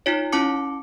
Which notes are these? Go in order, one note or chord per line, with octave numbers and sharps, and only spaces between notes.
D#4 F4 C#5
C#4 E4 A5 D6 C#7